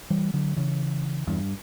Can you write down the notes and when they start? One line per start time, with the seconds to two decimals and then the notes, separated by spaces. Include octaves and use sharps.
0.10 E3 G3
0.33 D3 F#3
0.56 C#3 E3
1.27 E2 G2